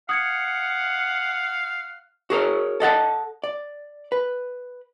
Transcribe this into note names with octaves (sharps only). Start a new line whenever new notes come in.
F5 F#5 D#6 G#6 C#7
F#4 G#4 A#4 C#5
A4 D#5 F#5 A5
D5
B4